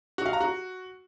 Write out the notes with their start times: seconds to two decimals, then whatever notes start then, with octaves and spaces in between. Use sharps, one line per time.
0.18 F#4
0.26 F5
0.33 A#5
0.41 F#4